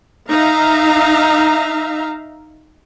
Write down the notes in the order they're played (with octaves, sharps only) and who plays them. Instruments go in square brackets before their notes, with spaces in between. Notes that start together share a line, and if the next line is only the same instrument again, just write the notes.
[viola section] D#4 E5 F5 A#5